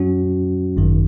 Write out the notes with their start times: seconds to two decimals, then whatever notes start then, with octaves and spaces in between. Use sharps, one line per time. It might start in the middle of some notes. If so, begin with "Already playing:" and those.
Already playing: F#2 F#3 C#4 F#4
0.77 G#1 F#2 D#3